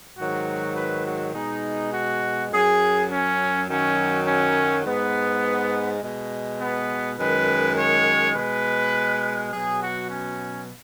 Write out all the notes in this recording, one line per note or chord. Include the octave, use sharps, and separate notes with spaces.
G#2 D#3 F#3 F#4
B4
F#4
B2 G#3 D#4
F#4
F#2 F#3 G#4
C#4
F#2 D#3 F#3 C#4
C#4
G#2 G#3 B3
B2 G#3
B3
F#2 D#3 G#3 B4
C#5
B2 G#3 B4
B2 F#3 G#4
F#4
C#4